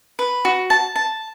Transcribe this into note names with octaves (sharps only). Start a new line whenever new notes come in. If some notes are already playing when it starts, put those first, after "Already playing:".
B4
F#4
A5
A5